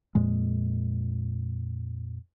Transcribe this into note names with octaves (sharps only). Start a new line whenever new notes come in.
F2 A#2 G#3